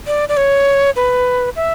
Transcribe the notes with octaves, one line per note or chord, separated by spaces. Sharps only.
D5
D5
C#5
B4
E5